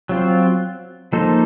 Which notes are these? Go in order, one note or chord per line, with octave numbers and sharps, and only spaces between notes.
F#3 C4 F4
F3 A#3 D#4 A4 C5